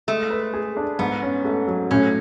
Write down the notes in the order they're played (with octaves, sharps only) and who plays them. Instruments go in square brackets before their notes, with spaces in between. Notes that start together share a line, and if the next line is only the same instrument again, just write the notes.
[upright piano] G#3 [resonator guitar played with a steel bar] A3
[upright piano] B4
G#4
D4
[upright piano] G#2 [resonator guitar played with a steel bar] B3
[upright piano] C#4
A3
F#3
[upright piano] A2 [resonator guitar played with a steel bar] C#4